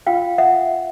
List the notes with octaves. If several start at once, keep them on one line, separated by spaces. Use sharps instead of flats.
F4 F5 G5
E5 F#5